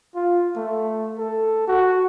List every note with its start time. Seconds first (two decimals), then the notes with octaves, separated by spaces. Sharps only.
0.15 F4
0.56 A3
1.18 A4
1.68 F#4